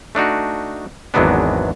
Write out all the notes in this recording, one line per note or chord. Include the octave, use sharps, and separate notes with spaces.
A3 D4 D#4 F#4
G#1 E2 F#3 G#3 B3 D4